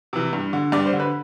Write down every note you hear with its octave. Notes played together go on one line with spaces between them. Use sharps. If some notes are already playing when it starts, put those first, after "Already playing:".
C3 E3
G2
D3
G2 D5
C5
D3
B4